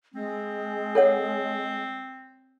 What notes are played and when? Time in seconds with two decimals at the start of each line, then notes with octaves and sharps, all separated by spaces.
0.14 G#3 C4
0.95 A4 C#5 F#5